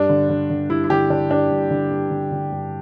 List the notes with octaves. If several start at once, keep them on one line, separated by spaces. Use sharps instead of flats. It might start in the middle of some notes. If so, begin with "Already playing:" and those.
Already playing: G2 D4
D3
D3
D3
G2 E4
E4
D3 G4
D3 D4
G2 D4
G2
D3
G2
D3
D3
G2